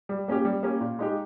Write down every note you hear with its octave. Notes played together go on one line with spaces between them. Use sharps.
G3
A#3 C#4 G4
G3
A#3 C#4 G4
A#2
G#3 D#4 G4